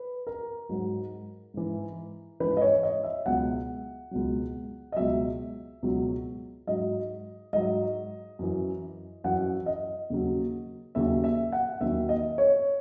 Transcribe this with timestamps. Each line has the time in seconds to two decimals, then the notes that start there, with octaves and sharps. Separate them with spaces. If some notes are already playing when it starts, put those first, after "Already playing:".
Already playing: B4
0.27 A#4
0.69 G#2 F#3
1.54 G#2 E3
2.40 G#2 E3 B4
2.57 D#5
2.61 C#5
2.83 D#5
3.04 E5
3.26 C#2 B2 F#3 F#5
4.11 C#2 B2 F#3
4.92 D#5
4.96 C#2 B2 F#3 E5
5.82 C#2 B2 F#3
6.67 G#2 F#3 D#5
7.53 G#2 F#3 D#5
8.39 F#2 E3
9.24 F#2 E3 F#5
9.66 D#5
10.10 D#2 C#3 F#3
10.95 D#2 C#3 F#3 E5
11.24 E5
11.52 F#5
11.81 D#2 D#3 F#3 E5
12.09 D#5
12.38 C#5